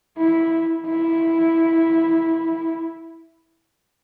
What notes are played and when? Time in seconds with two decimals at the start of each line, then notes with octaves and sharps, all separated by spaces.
0.18 E4
0.86 E4